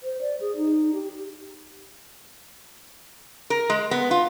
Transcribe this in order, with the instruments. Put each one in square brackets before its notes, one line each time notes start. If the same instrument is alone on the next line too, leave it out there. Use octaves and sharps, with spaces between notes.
[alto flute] C5
D5
G#4
D#4
G4
[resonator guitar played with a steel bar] A#4
G#3
B3
F4